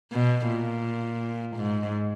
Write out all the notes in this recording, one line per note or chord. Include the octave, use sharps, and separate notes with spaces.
B2
A#2
G#2